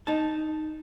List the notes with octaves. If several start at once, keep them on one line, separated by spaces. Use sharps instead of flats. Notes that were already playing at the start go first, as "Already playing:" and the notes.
D#4 A5